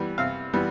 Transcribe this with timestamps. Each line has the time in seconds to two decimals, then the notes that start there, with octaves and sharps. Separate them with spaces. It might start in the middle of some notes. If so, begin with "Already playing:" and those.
Already playing: E3 G3 B3
0.18 C3 F5
0.53 E3 G3 B3